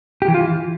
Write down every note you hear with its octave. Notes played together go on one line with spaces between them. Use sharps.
G4
E3
F4
E3